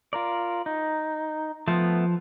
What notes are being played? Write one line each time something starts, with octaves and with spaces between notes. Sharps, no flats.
F4 A#4 D5
D#4
F3 A3 B3